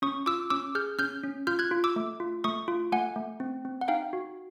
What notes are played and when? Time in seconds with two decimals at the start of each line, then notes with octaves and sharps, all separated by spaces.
0.02 C#4 C#6 D#6
0.26 F4 D6 E6
0.50 C#4 D6 E6
0.75 G#4 F6 G6
0.99 C#4 F6 G6
1.23 C#4
1.47 F4 F6 G6
1.59 F#6 G#6
1.71 F4
1.84 D6 E6
1.96 A3
2.20 F4
2.44 A3 C#6 D#6
2.68 F4
2.92 A3 F#5 G#5
3.16 A3
3.40 C4
3.65 C4
3.81 F#5
3.88 D#4 F5 G5
4.13 F#4